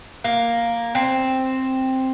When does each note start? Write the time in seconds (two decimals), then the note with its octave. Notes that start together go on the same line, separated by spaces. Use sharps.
0.24 A#3
0.95 C4